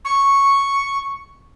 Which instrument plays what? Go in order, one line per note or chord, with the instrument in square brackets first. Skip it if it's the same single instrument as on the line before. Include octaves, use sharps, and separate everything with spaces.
[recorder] C#6